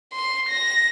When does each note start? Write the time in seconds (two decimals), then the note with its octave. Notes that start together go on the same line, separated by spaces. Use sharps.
0.13 C6
0.49 A#6